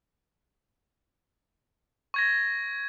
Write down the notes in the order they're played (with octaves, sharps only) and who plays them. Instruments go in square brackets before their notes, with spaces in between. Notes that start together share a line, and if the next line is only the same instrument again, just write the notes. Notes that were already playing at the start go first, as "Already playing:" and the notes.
[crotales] C#6 G#6 A#6